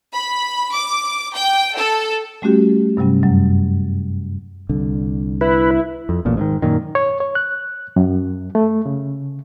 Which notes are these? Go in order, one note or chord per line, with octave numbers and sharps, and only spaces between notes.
B5
D6
G5
A4
G3 A3 C#4 F#4 G4
G2 C3 F#3 G3 C#4
F#2 F#3 G3
C2 D3
E4 B4
F2
D1 A1 A#2
G#2 D3 D#3
F#2 A#2 D#3
C#5
C#5
F#6
F#2
A3
C#3